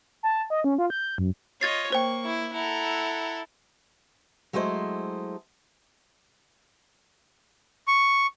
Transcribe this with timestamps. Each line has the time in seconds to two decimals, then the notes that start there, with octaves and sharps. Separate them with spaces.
0.23 A5
0.50 D#5
0.64 C#4
0.78 F4
0.90 G6
1.18 F#2
1.61 F4 C#5 D#5 G#6 A6 C7
1.92 A#3 C5 G5 C#6
2.25 E4
2.54 E4 A4 F#5 A#5
4.53 F#3 G#3 A3 E4 C5 D#5
7.88 C#6